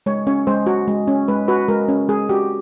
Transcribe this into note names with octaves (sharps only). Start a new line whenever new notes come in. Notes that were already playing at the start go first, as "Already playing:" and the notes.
G#3 C#5
C#4 C#5
G#3 C5
F#4
G#3
C#4
G#3 B4
F#4 B4
G#3 A#4
C#4
G#3 G#4
F#4 G4